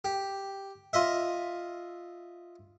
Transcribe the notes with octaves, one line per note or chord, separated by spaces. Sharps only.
G4
F4 D#5 E5